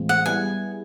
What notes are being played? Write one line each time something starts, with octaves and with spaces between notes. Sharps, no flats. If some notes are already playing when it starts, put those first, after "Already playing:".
Already playing: A2 E3 G#3 C4 F4
F#5
G3 B3 E4 G#4 G#5